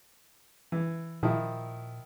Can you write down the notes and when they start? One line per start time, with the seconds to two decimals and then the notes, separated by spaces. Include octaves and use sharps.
0.72 E3
1.23 A#2 D#3 F3 E4